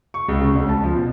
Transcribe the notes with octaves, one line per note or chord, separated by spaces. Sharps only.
C#6
C#2
C#3
D2
A5
F3
B2